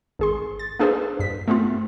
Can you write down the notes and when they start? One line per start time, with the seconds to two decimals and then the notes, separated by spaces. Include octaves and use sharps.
0.19 G#1 G#4 C6
0.59 A6
0.79 A#3 D4 G#4 A4 B4 C5
1.19 G2 B6
1.48 A3 B3 C4 F4